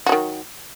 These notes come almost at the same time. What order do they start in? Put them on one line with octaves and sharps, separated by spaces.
F#4 F#3 D#3